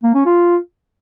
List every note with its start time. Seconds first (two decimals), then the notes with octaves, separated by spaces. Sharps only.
0.03 A#3
0.14 C#4
0.26 F4